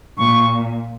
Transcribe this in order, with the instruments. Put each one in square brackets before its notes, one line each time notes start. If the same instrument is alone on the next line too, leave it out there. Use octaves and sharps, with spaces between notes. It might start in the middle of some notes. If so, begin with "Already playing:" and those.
[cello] A#2 [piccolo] C#6